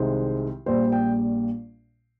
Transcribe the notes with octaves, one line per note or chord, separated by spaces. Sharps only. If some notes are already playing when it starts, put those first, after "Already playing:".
Already playing: C2 C3 D#3 G#3 C5
A#1 A#2 G3 C5
G5